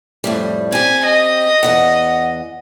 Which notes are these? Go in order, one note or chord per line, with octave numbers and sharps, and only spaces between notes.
F2 A2 G3
C4 G4 G#5
D#5
E2 C#3 F#5